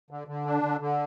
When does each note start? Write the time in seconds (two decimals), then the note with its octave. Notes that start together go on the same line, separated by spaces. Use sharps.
0.11 D3
0.28 D3
0.46 D4
0.63 D3
0.80 D3